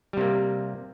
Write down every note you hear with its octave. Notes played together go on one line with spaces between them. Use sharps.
C3 G3 A#3